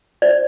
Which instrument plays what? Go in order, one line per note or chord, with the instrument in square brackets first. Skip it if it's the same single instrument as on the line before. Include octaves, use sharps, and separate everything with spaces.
[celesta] C5 [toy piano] D5